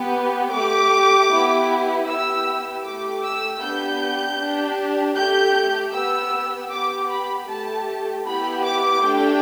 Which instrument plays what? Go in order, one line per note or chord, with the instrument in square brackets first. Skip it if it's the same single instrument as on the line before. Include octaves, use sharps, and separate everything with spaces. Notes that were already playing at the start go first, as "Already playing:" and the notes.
Already playing: [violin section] B3 G4
A3 G4 D6
B3 E4 G4
B3 E4 G4 E6
A3 G4 D6
E6
B3 D4 G4 G6
D4 G4
A3 G4 G6
B3 G4 E6
B3 G4 D6
B5
A3 G4 A5
B3 E4 G4 B5
D6
A3 D4 G4 G5